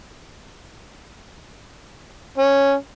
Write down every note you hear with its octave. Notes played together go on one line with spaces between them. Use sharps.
C#4